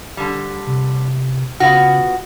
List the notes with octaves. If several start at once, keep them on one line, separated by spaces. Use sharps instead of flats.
D3 G3
C3
C#3 B3 F4 F#4